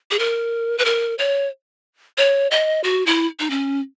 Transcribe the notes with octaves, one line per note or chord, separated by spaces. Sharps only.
G#4
A#4
B4
A#4
C#5
C#5
D#5
F#4
E4
D#4
C#4